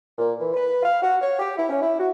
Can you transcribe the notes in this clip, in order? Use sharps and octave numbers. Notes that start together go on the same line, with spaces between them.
A#2
E3
B4
F5
F#4
C#5
G4
E4
C#4
E4
F#4